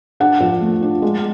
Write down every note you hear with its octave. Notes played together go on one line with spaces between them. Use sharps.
D4 F#5
F3
A3
D4
G#3